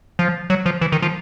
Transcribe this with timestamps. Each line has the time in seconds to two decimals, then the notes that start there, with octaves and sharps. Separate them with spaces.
0.19 F3
0.50 F#3
0.66 F3
0.81 E3
0.92 D#3
1.02 F3